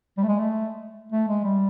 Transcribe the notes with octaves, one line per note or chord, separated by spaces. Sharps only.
G3
A3
G#3
A3
A3
G#3
G3